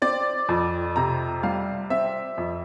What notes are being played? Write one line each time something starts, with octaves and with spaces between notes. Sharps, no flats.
C4 D5
F2
C3 A#5
G3 F5
C4 E5
F2